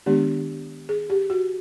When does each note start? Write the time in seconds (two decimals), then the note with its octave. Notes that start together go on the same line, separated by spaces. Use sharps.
0.06 D#3 G#3 B3 D4 G4
0.89 G#4
1.10 G4
1.30 F#4